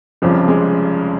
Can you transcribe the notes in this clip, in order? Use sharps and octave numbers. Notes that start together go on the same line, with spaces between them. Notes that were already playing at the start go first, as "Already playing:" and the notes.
F1 F2 C#3 F3 G3
G#3